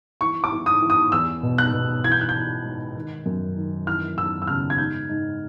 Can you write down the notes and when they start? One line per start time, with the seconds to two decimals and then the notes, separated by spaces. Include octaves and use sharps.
0.21 E3 C#6
0.44 D6
0.52 E3
0.66 D#6
0.82 E3
0.90 D#6
1.12 E2 E6
1.43 B2
1.58 F#6
1.73 B2
2.04 E3 G#6
2.12 G6
2.21 F#6
2.29 G6
2.35 E3
2.65 G#2
2.96 D#3
3.26 F#2
3.57 D#3
3.86 E3 F6
4.17 F#2 E6
4.42 E6
4.47 C#3 F6
4.70 G#6
4.78 G#2 G6
5.09 G#2